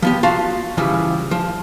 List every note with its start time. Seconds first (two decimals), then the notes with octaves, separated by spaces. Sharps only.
0.02 F3 B3 G4
0.23 F4 F#4 F5 A5
0.77 C#3 E3 F3 G3
1.31 F3